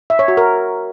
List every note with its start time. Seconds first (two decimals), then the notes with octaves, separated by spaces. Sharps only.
0.10 E5
0.19 C#5
0.28 F#4
0.37 A#4